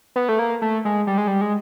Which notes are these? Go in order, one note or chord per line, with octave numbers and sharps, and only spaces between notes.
B3
A3
A#3
A3
G#3
G3
G#3
G3
G#3